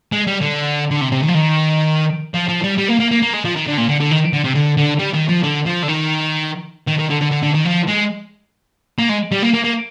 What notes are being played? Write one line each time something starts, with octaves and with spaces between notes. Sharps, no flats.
G#3
G3
D3
D3
C3
C3
D#3
F3
D#3
F3
F3
G3
G3
A#3
A#3
A#3
A#3
G#3
F3
D#3
D3
A#2
D3
D3
D#3
D3
C3
D3
D3
G3
D#3
F3
D3
F3
D3
D#3
D#3
D#3
D3
D3
D3
D3
D#3
F3
G#3
A#3
G#3
G3
A#3
A#3
A#3